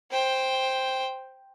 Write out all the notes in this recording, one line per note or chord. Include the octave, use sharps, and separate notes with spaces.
C5 G5